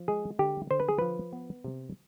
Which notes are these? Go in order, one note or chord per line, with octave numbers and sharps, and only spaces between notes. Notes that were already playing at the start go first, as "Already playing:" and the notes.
Already playing: F3
G#3 G#4
D3 G4
D3 C5
B4
G#4
F3 B4
B3
C3